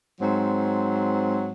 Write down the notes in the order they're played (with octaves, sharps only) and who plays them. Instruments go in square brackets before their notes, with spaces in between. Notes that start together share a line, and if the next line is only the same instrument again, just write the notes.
[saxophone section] G#2 F#3 C4